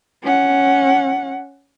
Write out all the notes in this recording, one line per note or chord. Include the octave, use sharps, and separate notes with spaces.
C#4 F#5